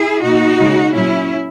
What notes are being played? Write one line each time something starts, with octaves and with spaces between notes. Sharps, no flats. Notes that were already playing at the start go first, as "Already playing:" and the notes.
Already playing: E4 G#4
B2 A#3 D#4 F#4
C#3 G#3
A#2 F#3 A#3 C#4 E4